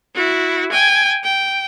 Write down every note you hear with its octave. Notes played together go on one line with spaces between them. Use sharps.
E4 F#4
G5 G#5
G5